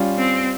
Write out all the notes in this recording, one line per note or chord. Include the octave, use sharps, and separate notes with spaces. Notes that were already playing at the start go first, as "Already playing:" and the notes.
Already playing: G3 C#4 F4
C4